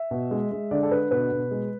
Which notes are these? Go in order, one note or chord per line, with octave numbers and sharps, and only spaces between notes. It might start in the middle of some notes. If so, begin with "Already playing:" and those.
Already playing: E5
B2
G#3
G#3
D3 D5
A4
D3 B4
B2 B4
B2
G#3